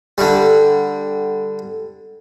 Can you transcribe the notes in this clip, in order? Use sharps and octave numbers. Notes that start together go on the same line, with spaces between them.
D3 G3